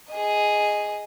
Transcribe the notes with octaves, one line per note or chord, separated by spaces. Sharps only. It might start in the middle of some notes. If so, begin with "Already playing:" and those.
G#4 D#5